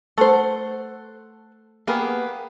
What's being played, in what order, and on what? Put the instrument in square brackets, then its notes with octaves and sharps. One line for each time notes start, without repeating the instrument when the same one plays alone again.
[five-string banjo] A3 C5 [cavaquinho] A4 F#5
[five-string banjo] A#3 B3 [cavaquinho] G4 G#4 B4